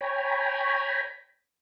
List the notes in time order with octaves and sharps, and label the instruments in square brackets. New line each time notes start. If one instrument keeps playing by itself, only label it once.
[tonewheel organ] C#5 G5 G#5 A#5 B5